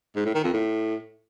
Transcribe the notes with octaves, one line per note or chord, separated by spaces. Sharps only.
G#2
A2
D#3
F2
A2